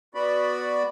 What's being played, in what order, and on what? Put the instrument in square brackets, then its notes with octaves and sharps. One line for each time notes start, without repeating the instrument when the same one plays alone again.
[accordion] B3 F#4 D5 B5